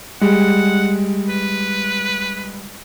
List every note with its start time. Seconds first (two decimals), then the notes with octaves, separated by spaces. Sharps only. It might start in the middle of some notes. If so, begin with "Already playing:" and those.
0.21 G3 G#3 F#5
1.29 B4